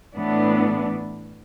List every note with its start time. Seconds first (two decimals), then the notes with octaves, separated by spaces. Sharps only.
0.15 A2 E3 B3 D4